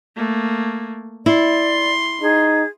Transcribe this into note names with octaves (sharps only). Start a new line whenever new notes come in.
A3 A#3
E4 D5 C6
D#4 G#4